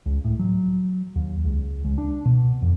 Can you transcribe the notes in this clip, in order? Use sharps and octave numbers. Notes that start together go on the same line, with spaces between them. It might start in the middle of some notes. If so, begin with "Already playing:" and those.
C#2
A2
F#3
D#2
C#2
C#2
D4
B2
F2